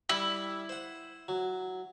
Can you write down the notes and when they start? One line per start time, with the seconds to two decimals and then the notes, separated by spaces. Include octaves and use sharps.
0.09 G3 E4
0.69 C5 F#5
1.28 F#3